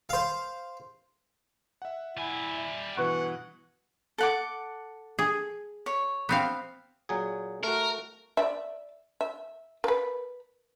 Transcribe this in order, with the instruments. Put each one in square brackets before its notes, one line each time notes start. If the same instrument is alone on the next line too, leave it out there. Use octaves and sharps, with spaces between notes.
[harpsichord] C5 F5
[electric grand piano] E5 F#5
[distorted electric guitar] G3 G#5 [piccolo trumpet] E4
[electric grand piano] E5
[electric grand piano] G2 B2 E3 [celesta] B4 C#6 F#6 [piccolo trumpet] F#5
[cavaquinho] A4 F#5 D6
[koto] G#4
[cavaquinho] C#5
[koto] B3 C4 F5
[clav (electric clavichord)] A#2 F#3 G#4
[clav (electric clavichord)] A3 F#4 [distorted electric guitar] A#4
[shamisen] D5 E5
E5
A#4 B4